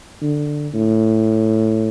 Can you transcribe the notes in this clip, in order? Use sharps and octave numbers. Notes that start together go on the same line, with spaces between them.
D3
A2